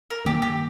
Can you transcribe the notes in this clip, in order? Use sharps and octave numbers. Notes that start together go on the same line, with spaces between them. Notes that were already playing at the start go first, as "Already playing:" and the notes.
A#4
G2 D#3 A#3 G4
G4